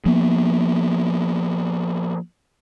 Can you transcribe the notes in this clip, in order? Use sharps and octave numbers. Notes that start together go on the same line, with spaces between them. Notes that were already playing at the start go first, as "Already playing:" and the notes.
F3 A#3 B3